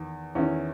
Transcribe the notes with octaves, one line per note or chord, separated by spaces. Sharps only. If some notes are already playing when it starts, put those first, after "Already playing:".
Already playing: E2 D#3
E2 D#3 C#4 E4